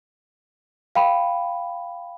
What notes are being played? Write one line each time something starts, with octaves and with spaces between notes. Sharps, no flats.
F5 G5 B5